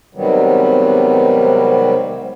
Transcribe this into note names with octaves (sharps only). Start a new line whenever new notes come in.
G#2 C3 D#3 F#3 G3 B3